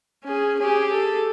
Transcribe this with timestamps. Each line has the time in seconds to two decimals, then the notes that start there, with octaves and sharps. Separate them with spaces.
0.24 C#4 G#4
0.60 G4 G#4
0.92 A4